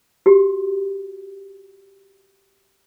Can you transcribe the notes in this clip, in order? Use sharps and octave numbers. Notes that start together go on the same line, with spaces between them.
F#4 G4